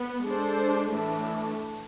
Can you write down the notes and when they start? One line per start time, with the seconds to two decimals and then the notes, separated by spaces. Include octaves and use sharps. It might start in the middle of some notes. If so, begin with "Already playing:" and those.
Already playing: B3
0.25 G#3 D4 A4 C5
0.90 A2 E3 A3 D4